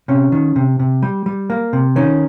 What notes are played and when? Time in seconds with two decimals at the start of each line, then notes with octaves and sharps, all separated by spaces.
0.08 C3 C#4
0.32 D#3
0.56 C3
0.79 C3
1.03 G3
1.26 G3
1.50 A#3
1.73 C3
1.96 D#3 C#4